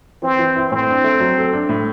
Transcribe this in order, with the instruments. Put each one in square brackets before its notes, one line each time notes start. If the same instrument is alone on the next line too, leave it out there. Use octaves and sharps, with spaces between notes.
[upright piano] E3 [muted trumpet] C4
[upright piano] E3
E4
[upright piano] A2 [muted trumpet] C4
[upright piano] D4
A3
F#3
A4
D4
A2